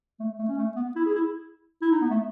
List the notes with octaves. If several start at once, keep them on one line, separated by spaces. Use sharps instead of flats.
A3
A3
C#4
A3
B3
E4
G#4
E4
E4
D#4
B3
A3